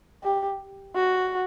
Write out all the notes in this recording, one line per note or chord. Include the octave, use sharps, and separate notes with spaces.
G4
F#4